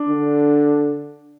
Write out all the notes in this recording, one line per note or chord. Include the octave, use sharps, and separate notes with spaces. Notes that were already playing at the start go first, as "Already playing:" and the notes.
Already playing: D4
D3